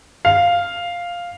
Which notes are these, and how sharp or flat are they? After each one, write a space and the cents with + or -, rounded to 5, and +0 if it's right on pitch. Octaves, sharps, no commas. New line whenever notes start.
F5 +0